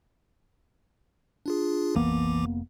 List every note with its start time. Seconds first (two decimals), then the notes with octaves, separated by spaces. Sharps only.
1.46 D4 F4 G#4
1.95 F1 A#1 E3 A#3 B3 D6